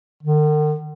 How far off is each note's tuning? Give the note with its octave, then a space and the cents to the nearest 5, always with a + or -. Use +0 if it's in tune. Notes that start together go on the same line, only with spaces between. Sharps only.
D#3 -45